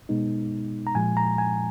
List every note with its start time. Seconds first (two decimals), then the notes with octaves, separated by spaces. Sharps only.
0.09 B2 G#3 B3 D#4
0.87 A#5
0.95 A#2 F3 G#3 G#5
1.17 A#5
1.38 G#5